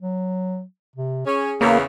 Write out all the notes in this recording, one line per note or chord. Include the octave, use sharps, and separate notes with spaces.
F#3
C3
C#4 G#4
E2 C#3 A#3